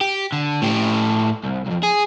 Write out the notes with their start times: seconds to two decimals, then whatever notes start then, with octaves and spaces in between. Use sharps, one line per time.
0.01 G4
0.32 D3
0.62 A2 G4
1.43 C2
1.66 B1 F2
1.83 G#4